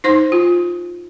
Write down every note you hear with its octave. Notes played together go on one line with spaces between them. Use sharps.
D#4 C5 C6
F4